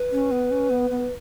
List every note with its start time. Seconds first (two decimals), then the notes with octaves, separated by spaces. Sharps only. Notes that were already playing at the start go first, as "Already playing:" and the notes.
Already playing: B4
0.11 C#4
0.31 B3
0.51 C#4
0.70 B3
0.90 B3